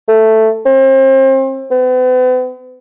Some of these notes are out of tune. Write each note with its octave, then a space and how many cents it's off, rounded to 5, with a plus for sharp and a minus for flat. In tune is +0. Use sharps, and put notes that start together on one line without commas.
A3 +5
C4 +35
B3 +45